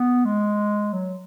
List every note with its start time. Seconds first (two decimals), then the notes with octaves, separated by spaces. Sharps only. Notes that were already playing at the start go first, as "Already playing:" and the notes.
Already playing: B3
0.25 G#3
0.93 F#3